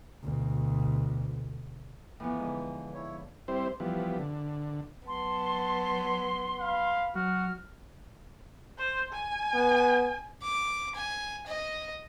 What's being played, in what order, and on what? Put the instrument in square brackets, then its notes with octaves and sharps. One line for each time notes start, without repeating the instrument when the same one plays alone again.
[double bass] D2 B2
[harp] A2 F3 B3 [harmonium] E3
[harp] G#2 D3
[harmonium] E4 C#5
[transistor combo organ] G3 C4 E4 C5
E3 F3 G3 B3
D3
[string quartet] F#3 B3 [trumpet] A5 [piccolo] C6
[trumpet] F5 [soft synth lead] B5
[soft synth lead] F#3 [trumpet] F#4 [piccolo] F6
[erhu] C5
G#5
[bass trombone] B3
[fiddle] D6
G#5
D#5